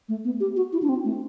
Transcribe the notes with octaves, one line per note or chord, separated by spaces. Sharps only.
A3
B3
G4
F#4
E4
D4
C4
A3